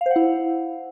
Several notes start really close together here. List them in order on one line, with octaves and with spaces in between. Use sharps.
F5 C5 F#5 E4